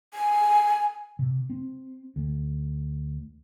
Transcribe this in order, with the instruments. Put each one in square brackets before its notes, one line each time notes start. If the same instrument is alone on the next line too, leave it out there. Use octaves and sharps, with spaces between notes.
[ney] G#5
[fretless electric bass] C3
C4
D2